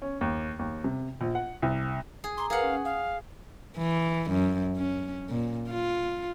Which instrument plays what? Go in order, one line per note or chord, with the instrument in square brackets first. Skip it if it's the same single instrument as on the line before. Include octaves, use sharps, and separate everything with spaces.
[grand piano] C#4
D#2
D#2
C3
A#1
F#5
C2
[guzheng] G#4
[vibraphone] A#5 D6 [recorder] C6
[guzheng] G#4 F#5 [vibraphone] A#4 B4 [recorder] F5
[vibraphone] C#4
[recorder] F5 [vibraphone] D#6
[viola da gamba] E3
F#2
C#4
A#2
F4